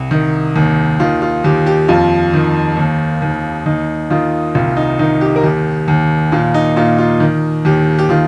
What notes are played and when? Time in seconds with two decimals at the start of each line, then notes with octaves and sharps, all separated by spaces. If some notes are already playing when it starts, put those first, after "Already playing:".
Already playing: C2
0.11 D#3
0.56 D#2
1.00 D#3 F4
1.22 F4
1.44 D#2 G4
1.66 G4
1.88 F2 F4
2.34 D#3
2.77 D#2
3.22 D#2
3.66 D#2 D#4
4.10 D#3 F4
4.55 C2 F4
4.77 D#4
4.99 D#3 D#4
5.21 G4
5.36 A#4
5.43 D#2 G4
5.88 D#2
6.32 A#2 F4
6.54 D#4
6.76 A#2 F4
6.99 F4
7.20 D#3
7.65 D#2 G4
7.99 G4
8.09 D#3 F4